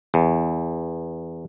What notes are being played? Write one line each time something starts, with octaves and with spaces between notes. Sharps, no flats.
E2